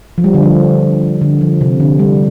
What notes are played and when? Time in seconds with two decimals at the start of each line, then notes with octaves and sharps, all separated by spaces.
0.18 F3
0.24 G3
0.34 D3
0.43 F3
1.21 D3
1.41 F3
1.61 C3
1.80 D3
1.99 G3